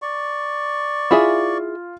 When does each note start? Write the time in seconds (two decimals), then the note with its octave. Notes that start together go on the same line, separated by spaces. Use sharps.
0.02 D5 C#6
1.11 E4 F4 G#4 E5